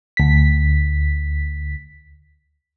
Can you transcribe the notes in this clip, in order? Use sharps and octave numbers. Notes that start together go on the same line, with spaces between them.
D2 B6